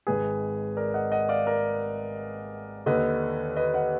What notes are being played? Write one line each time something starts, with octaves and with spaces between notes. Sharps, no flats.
G#1 G#2 D#3 G#4 B4
A#4 D5
D#5 F#5
D#5 F#5
D5 F5
A#4 D5
D#2 D3 B4 D#5
B4 D#5
D#5 F#5